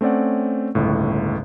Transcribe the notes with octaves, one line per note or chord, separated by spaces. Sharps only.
A3 C4 C#4 D5 F#5
G1 C#2 A2